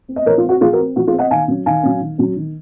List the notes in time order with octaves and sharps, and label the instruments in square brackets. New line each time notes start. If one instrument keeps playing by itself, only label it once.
[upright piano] C4
D#5
F3 A#4 C#5
F4
C4
F#4
F3 F4 G#4
F#4 A#4
C4
F3 F#4
F4 G#4
C4
D#5 F#5
D#3 F5 G#5
F#3 C#4
D#3 F5 G#5
F#3 C#4
D#3
F#3 C#4
D#3